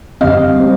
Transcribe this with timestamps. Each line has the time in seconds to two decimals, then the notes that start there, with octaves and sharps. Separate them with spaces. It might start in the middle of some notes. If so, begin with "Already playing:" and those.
0.21 F#2 D3 G3 C4 D#5 F5
0.60 G3 C4